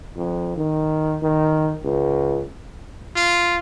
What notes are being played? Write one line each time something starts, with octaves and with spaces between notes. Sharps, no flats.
F2
D#3
D#3
C#2
F4